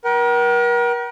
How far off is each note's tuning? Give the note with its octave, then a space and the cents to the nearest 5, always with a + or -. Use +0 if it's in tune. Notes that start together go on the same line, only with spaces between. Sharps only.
A#4 +40 G5 -45